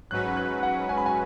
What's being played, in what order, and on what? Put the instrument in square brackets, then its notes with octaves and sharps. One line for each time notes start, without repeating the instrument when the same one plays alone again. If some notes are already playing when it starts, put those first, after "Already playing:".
[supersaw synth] G#2 F#3 C#4 F#4 B4 [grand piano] F#6
[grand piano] F#6
F#5
G#5
B5
G#5